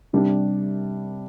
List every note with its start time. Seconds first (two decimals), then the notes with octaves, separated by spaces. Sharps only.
0.13 C3 G3 D4 G4